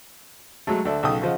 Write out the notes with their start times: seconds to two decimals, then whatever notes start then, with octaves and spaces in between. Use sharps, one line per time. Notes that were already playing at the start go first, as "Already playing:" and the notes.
0.67 F#3 G#3 A3
0.85 D2 A4 D5 E5
1.03 B1 C#3 A4 G5 D#6
1.22 C#3 F3 D#5 F#5